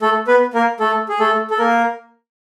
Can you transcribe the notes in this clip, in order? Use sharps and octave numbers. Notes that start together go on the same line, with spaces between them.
A3 A4
B3 B4
A#3 A#4
A3 A4
G#4
A3 A4
A4
A#3 A#4